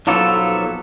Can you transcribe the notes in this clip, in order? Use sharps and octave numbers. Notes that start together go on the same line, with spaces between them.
B1 F3 F#3 A#3 B3 A4